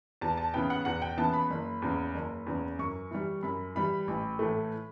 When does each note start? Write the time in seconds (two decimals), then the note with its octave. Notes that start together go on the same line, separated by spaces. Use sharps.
0.21 E2 A5
0.37 A5
0.54 C#3 E3 B3 G5
0.70 F#5
0.85 E2 F#5
1.02 G5
1.17 C#3 E3 B3 A5
1.33 B5
1.50 F#1
1.82 E2 C#3
2.14 F#1
2.47 E2 C#3
2.79 F#2 C#6
3.11 E3 G3
3.43 F#2 B5
3.75 E3 G3 B5
4.08 A1
4.39 A2 E3 A3